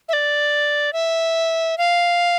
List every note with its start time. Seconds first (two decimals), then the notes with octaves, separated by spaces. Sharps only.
0.09 E5
0.13 D5
0.93 E5
1.78 F5